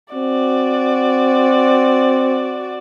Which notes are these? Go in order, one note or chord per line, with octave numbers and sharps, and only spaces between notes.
C4 F#4 D5